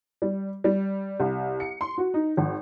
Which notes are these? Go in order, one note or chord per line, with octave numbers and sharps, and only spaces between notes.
G3
G3
C2
C#7
C6
F#4
D#4
G#1